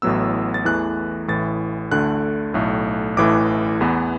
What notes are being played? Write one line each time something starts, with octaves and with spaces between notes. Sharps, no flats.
A1 A2 F#3 B3 E6
A6
E2 E3 A3 F#6
A1 A2 E3 A6
D2 D3 A3 F#6
B1 A2 A3
A1 A2 E3 A3 D6
E2 E3 B3